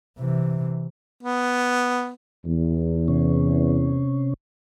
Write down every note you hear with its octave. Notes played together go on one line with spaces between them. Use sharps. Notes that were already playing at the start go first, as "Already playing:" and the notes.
C3 E3
B3
E2
C3 C#4